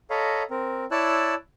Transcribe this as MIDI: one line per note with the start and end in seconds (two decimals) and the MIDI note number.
0.10 0.43 69
0.10 0.43 73
0.10 0.43 75
0.10 0.43 77
0.10 0.43 82
0.10 0.43 83
0.51 0.85 60
0.51 0.85 70
0.91 1.35 64
0.91 1.35 73
0.91 1.35 74
0.91 1.35 81
0.91 1.35 88
0.91 1.35 90